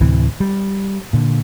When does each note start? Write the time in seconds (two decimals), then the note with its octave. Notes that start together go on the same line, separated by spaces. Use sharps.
0.01 D2 A2 C3 E3
0.40 G3
1.13 A#2 D3